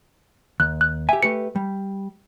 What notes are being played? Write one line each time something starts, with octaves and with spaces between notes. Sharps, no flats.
D#2 F#6
F#6
G4 E5 G#5
A3 G4 B4 C#7
G3